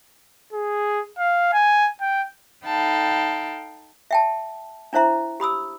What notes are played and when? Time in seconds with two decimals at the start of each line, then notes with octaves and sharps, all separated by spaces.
0.53 G#4
1.18 F5
1.53 G#5
2.01 G5
2.66 D#4 A4 F5 G5 A5 B5
4.11 E5 G5 A5
4.93 D4 E4 C5 E5 A#5
5.40 G4 B5 D#6 E6